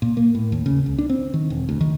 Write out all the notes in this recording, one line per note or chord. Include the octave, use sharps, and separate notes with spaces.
A#2
A#3
A2
D#2
C#3
C#2
D4
C4
D#3
E1
D2
D#3